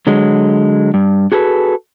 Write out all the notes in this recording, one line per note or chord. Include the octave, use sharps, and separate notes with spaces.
D3 F#3 G#3
G2
F#4 G#4 A4 B4